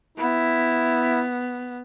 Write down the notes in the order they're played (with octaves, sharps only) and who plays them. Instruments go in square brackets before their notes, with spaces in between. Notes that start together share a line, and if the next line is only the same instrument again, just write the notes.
[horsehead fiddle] B3 [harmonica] E4